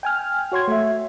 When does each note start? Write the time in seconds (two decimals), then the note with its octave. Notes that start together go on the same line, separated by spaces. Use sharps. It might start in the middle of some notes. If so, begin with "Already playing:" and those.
0.03 G5 G#5 F6
0.52 F#4 C#5 C6 G#6
0.68 A3 E5